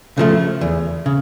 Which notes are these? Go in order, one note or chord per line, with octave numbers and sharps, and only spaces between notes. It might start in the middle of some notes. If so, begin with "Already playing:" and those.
C#3 F3 A3
E2
C#3